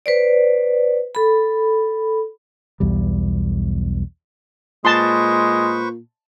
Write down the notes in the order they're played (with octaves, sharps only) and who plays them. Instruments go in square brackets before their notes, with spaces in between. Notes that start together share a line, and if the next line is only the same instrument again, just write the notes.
[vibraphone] B4 C5 D5
A4 B5
[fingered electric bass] B1 E2 G3
[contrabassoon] A#2 [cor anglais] G#3 [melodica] B4 C5 C#6 [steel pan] A5 C6